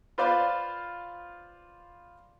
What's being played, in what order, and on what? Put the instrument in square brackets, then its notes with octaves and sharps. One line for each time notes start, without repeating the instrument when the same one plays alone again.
[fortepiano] F4 B4 C5 D5 F5